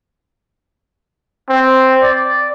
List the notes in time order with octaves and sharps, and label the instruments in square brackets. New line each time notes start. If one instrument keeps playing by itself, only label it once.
[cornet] C4
D5